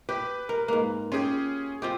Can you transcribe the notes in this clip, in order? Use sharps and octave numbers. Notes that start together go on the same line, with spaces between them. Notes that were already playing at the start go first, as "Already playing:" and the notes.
G4 B4
A#4
G#2 A#3
C#4 F4 G4 G#4
C4 F4 G4